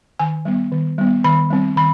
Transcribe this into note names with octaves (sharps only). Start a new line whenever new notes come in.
D#3 G#5
G3 B3
D#3
G3 B3
D#3 B5
G3 C4
D#3 B5